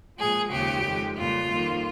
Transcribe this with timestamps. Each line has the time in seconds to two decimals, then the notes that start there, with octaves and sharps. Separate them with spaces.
0.18 A#2 F3 G#3 G#4
0.51 D#2 C#3 F3 G#3 G4
0.84 F2 D#3 G#3
1.17 F2 C#3 G3 A#3 F4
1.50 F2 D#3 G3 A#3